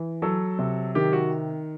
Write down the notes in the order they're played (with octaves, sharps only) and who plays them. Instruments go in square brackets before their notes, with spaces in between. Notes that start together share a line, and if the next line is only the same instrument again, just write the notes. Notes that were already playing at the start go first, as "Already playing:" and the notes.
Already playing: [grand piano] E3
F#3 A4
C3
D#3 G4
F#4